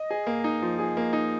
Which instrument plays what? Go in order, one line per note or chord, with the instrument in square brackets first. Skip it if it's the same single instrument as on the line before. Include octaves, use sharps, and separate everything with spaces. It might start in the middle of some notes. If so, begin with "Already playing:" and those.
Already playing: [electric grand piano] D#5
[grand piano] G#4
A#3
D#4
F3
G#4
A#3
D#4